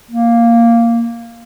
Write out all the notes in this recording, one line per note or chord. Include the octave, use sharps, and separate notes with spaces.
A#3